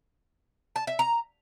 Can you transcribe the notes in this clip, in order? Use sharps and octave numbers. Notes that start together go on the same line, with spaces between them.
A5
E5
A#5